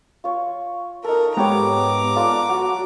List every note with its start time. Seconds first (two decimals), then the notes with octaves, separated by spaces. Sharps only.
0.24 F4 C#5
1.04 D#4 A4 A#4
1.37 G#2 B3 G4 C#5 A#5 D6
2.16 F4 A4 D5 F#5
2.49 F#3 F#4 F#5